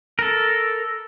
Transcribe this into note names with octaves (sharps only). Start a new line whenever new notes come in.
A4 A#4